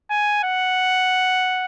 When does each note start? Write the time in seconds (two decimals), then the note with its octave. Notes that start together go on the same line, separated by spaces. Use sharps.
0.10 G#5
0.44 F#5